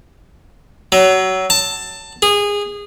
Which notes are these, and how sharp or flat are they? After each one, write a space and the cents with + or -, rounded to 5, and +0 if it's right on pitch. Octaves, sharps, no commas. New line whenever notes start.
F#3 +25
A5 +15
G#4 -20